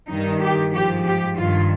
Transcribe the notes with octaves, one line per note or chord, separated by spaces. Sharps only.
G2 D#3 D#4
G4
G#2 F3 G4
G4
G2 D#3 F4